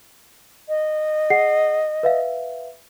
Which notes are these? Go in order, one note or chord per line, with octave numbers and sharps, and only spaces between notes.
D#5
G#4 F#5 C7
B4 E5 F5